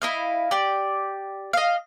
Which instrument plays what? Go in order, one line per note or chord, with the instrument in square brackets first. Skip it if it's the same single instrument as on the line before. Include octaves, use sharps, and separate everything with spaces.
[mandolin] E4 D#5 F5
G4 D5
D#5 F5